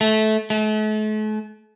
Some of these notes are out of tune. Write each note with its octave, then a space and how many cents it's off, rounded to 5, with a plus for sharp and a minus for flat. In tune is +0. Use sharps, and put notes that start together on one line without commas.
A3 -20
A3 -40